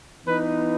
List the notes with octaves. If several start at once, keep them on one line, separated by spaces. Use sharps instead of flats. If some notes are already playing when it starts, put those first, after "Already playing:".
E3 B3 D#4 B4